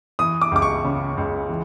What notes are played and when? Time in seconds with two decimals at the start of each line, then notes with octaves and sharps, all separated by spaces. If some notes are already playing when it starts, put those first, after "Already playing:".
0.19 E3 D#6
0.41 D6
0.52 C#2 D6
0.62 C#6
0.84 C#3
1.17 C#2
1.49 E3